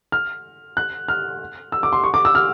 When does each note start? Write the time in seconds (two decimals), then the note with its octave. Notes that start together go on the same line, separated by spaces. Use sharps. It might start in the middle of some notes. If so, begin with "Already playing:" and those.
0.12 F6
0.77 F#6
1.08 F6
1.72 E6
1.83 D6
1.93 C6
2.04 C#6
2.14 D6
2.25 E6
2.35 F6